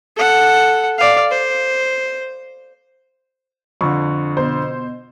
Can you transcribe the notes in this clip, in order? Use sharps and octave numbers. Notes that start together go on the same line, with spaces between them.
A4 F#5
D5 F5
C5
F2 D3 C#6
B2 C5